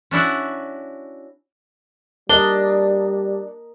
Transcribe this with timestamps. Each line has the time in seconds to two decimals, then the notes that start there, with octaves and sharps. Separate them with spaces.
0.11 C#4 D4 E4 F#4
2.29 G3 D4 A#4 D#5 G7